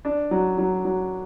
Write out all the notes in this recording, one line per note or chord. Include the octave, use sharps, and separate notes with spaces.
D4
F#3
F#3
F#3